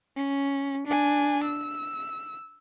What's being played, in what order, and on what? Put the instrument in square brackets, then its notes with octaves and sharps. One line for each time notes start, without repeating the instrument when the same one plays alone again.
[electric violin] C#4
D4 G#5
E6